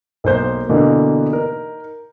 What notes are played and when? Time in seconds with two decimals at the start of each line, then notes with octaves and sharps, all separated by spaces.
0.24 B1 A#3 C5 G6
0.69 B2 D3 E3 A#3
1.31 D#4 A#4